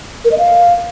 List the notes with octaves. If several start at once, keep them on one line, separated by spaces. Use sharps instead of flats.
A#4
D#5
F5